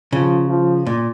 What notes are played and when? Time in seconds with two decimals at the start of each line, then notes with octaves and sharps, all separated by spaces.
0.13 C#3 F3
0.49 F3
0.86 A#2